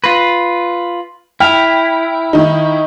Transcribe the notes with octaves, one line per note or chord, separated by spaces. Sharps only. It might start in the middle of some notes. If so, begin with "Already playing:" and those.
F4 B4 A#6
E4 G5 F6 B6 F7
D#3 D#4